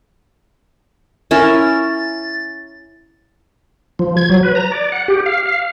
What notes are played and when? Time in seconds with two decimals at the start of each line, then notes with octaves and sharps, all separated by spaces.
1.31 C#4 E4 A#4 A6
3.99 F3
4.17 G#6
4.30 F#3
4.43 B4
4.55 A#5
4.72 D5
4.92 F#5
5.08 G4
5.26 F5
5.46 F5